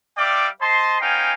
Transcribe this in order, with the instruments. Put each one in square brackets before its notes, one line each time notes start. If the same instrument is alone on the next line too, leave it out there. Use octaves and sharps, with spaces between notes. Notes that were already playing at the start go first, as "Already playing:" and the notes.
[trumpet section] G3 D5 E5 F5 G5 D6
C5 D#5 A5 C6
B3 C#4 D#4 F5 G5 G#5